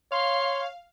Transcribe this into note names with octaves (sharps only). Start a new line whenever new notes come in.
C#5 F5 C6